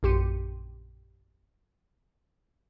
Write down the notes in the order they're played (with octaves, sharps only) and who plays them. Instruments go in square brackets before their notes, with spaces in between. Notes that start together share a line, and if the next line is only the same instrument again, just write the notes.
[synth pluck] A#1 F#2 G4 C6 C#7 D#7